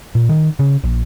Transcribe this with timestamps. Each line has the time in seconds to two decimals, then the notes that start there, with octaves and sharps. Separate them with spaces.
0.15 A#2
0.29 D#3
0.59 C#3
0.84 A#1